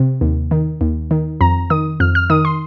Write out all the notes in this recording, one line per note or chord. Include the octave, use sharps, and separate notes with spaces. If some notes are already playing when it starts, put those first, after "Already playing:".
Already playing: C3
D#2
D#3
D#2
D#3
F2 A#5
D#3 D#6
F2 F6
F6
D#3 D#6
C6